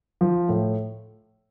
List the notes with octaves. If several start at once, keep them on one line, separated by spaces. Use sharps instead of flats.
F3
A2